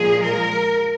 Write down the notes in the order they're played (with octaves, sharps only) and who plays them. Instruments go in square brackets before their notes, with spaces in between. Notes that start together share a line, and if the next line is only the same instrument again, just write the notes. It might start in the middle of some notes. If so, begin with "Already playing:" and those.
Already playing: [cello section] A#2 F3 G#3 G#4
A#4